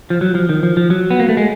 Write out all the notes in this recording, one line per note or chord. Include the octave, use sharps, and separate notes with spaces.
F3
F#3
F3
D#3
F3
F3
F#3
B3
A#3
A3
G#3